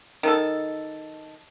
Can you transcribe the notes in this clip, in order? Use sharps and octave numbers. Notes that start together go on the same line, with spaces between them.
D#3 D#4 A4